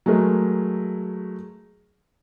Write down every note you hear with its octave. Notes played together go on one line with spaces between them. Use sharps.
F#3 G#3 A3 A#4